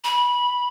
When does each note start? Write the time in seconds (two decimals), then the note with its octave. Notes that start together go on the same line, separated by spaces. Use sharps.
0.04 B5